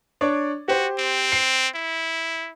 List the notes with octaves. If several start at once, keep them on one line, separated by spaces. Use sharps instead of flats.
D4 C#5 D5
F#4 G4 C5
C4
C7
E4